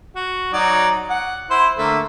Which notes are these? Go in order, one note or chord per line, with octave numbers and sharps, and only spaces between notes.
F#4
F#3 D#4 D5
F#5
E4 C5
D3 A3 A#3